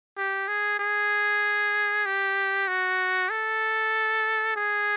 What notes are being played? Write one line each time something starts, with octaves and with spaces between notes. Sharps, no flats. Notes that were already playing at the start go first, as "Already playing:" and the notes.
G4
G#4
G#4
G4
F#4
A4
G#4